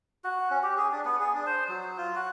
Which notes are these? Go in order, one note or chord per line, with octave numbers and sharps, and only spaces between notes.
F#4
C#4
G4
G#4
D4
B3
G#4
D4
C5
F#3
F4
F#4